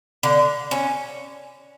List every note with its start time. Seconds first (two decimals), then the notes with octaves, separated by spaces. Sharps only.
0.23 D3
0.71 C#4